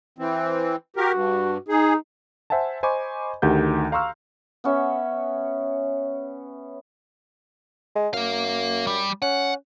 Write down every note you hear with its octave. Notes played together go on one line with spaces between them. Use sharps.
E3 C4
F#4 G4 A#4
G2
D#4 G#4
C5 E5 F#5 G#5 A5
C5 D#5 G#5 B5 C#6 D6
D2 D#3 G4 F#5 G6
F5 A#5 C6 C#6 E6 F6
B3 C#4 E5
G#3
F#2 A#3 F5
G3
C#4 F#5